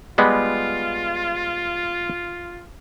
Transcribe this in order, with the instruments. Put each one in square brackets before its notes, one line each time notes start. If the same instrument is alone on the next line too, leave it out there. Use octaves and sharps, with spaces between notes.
[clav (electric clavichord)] G3 G#3 B3 [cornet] F4